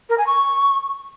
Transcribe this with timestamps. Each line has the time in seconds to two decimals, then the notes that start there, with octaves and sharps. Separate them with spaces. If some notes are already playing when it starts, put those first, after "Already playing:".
0.09 A#4
0.18 G#5
0.26 C#6